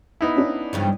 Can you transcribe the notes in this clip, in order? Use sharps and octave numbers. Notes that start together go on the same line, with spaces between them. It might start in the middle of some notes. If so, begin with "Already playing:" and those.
B3 D#4 E4
C#4 D4
G2 C#3 F3